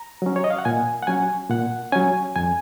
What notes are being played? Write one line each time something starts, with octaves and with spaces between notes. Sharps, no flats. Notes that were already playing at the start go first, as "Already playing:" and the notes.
Already playing: A#5
F#3 C#4
C#5
D#5
F5
F#5
A#2 G#5
F#5
F#3 C#4 G#5
A#2 F#5
F#3 C#4 G#5
F2 G#5